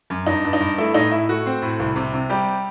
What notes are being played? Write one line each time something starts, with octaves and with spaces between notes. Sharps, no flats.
F#2
G2 D#4
G2
D#4
G2
A3 E4
A2 D#4
A2 E4
A3 F#4
C4
A2
C2
C3
C3
G3 G4